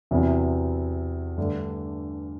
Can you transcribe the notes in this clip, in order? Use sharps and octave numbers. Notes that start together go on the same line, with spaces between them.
E2 C3 F#3 B3 E4
G2 D3 A3 D4